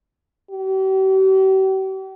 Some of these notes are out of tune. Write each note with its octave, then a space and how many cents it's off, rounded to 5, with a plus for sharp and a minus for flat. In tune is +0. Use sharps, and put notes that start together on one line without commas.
G4 -45